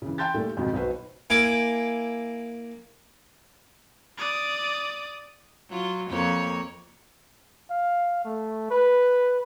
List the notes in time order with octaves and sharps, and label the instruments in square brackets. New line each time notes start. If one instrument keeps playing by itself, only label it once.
[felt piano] C#3 E3
G5 A5 C6 G6 A6
A#2 G3 A3
F2 G#2 B2 D#3
B1 D#4 F#4 B4 C5
[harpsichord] A#3 E4 G#5 D6
[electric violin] D5 D#6
[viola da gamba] F#3 F4
F2 A#3 C#5
[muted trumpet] F5
A3
B4